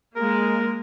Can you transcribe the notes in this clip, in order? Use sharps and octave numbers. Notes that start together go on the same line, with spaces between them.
G#3 A#3 A#4